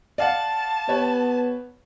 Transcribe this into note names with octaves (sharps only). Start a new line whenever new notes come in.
D5 F5 F#5 A5
B3 G4 B4 C#5